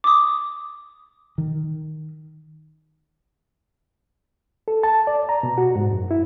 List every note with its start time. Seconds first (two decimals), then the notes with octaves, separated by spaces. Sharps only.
0.04 D6 D#6
1.38 D#3
4.68 A4
4.83 A5
5.07 D5
5.29 A#5
5.43 B2
5.58 F#4
5.76 G#2
5.93 F#2
6.11 E4